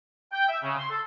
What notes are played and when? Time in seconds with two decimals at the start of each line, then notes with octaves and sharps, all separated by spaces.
0.32 G5
0.49 E5
0.63 C#3
0.77 C6
0.90 A4